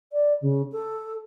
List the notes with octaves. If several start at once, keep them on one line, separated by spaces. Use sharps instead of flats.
D5
C#3
A4